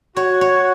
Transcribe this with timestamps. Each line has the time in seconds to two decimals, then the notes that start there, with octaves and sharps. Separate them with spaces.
0.16 F#4 C#5
0.41 C#5